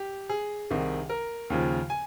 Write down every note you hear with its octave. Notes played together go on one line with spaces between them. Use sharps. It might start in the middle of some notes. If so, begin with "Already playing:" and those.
Already playing: G4
G#4
C2 C3 D#3
A#4
D#2 C#3 F3
G#5